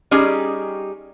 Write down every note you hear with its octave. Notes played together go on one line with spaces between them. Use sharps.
G3 C#4 D#4 G4 G#4